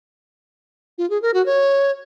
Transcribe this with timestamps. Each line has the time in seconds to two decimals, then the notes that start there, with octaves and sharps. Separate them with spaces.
0.98 F4
1.10 G#4
1.22 A#4
1.34 F#4
1.46 C#5